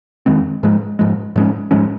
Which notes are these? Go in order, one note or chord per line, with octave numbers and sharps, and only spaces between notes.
F2 D#3 G#3 C4
G#2 F3 G#3
G#2 F3 G#3
G#2 F3 G#3 C#4
G#2 F3 G#3 C#4